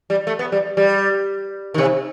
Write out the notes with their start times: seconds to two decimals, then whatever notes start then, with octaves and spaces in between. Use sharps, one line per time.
0.10 G3
0.27 A3
0.39 B3
0.52 G3
0.77 G3
1.74 D#3
1.78 C3